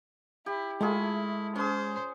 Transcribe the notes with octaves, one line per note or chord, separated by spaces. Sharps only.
E4 G4
G#3 A3 E4 F4 G#4
C#4 G#4 C5